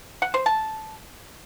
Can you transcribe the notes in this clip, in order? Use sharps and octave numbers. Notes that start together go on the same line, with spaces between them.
F#5
C5
A5